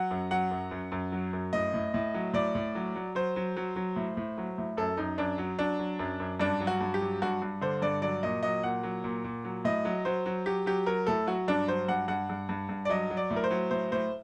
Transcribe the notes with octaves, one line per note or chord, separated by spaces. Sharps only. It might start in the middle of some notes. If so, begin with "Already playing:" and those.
Already playing: F#3 F#5
F#2
F#3 F#5
F#2
F#2
F#2
F#3
F#2
A2 D#5
A2
A2
F#3
A2 D5
A2
F#3
F#3
F#3 C5
F#3
F#3
F#3
A2
A2
F#3
A2
F#2 A4
F#2 D#4
F#2 D4
F#3
F#3 D4
F#3
F#2
F#2
G2 D4
F#3
F#4
G2
G4
F#3
G2 F#4
G2
D3 C5
G2 D5
F#3 D5
A#2 D#5
F#3 D#5
A#2 F#5
F#3
A#2
A#2
F#3
A2 D#5
F#3
F#3 C5
F#3
F#3 G4
F#3 G4
F#3 A#4
A2 A4
F#3 F#4
G2 D4
F#3 C5
G2 F#5
G2 F#5
G2
G2
G2
D5
F#3 D#5
F#3
D5
A2
A#4
C5
F#3
A2 C5
A2 C5